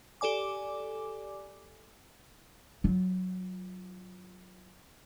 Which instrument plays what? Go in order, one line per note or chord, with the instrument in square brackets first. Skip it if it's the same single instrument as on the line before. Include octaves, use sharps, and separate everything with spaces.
[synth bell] G4 A4 D5 G#5 D6
[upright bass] F#3 F4